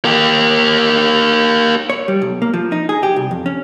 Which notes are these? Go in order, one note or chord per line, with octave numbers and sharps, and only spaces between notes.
A#3 G4
C#5
G3
B1
A#3
F3
D#4
G#4
G4
C2
F2
C#4